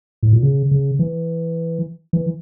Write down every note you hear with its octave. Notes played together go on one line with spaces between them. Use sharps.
A2
A#2
C#3
C#3
E3
E3